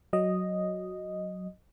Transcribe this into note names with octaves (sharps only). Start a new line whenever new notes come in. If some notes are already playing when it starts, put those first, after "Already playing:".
F#3 D#5